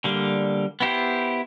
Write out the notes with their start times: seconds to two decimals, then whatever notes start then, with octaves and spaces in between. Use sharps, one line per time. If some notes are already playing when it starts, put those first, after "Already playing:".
0.04 D3 G3 A#3
0.80 B3 E4 G4 C5